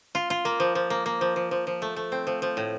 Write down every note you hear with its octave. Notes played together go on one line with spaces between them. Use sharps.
F4
F4
A#3
F3
F3
A#3
A#3
F3
F3
F3
F3
A3
A3
C4
F3
F3
A2